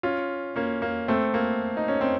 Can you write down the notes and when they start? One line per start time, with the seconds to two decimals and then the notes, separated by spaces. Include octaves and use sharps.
0.03 C#4 F4
0.56 A#3 C#4
0.82 A#3
1.08 A3 C4
1.34 A#3
1.77 D#4
1.88 C#4
2.01 C4